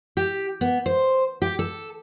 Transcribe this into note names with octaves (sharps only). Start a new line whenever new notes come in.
G4
B3
C5
G4
A4